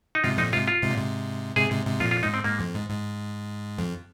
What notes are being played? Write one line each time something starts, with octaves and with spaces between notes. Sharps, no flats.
D#4
G#2 C3 F4
F2 A#2 D#4
G#2 C3 F4
F4
G#2 C3
A#2
G#2 C3
G#2 C3 G#4
G#2 C3
G#2 C3
F2 A#2 F4
F4
G#2 D#4
C4
G#2 A#3
F2
G#2
G#2
F2